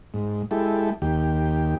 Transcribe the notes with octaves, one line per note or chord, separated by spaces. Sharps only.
G#2
G#3 E4 G4 A4
D#2 G4